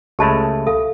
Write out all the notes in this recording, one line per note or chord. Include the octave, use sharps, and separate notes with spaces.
C#2 G#3 A3 G4 A5 B5
A4 E5 F5